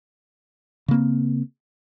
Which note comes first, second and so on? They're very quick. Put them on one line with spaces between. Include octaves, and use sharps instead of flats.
C#3 A#3 C4